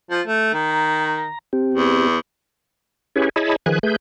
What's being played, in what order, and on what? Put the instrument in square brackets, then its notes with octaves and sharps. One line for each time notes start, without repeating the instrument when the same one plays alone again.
[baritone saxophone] F3
A3
D#3
[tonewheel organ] A#5
C4 G4
[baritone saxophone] E2
[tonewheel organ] C#4 E4 G4 G#4 B4 C#5
E4 G#4 C#5 D#5 A5 B5
D#3 F3 G#4 B4 G#5 F#6
A3 G#4 B4 G6